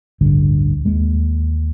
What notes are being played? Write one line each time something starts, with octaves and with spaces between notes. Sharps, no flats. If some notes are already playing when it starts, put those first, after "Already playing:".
A1 D2 G2 D3
D#2 G#3 A#3